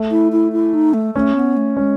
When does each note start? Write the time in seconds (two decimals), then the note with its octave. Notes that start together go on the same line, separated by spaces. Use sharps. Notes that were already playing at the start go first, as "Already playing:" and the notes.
Already playing: A3
0.11 E4
0.32 E4
0.52 E4
0.74 D#4
0.94 A3
1.14 A3 C#4
1.35 B3
1.57 A3
1.77 G#3 C#4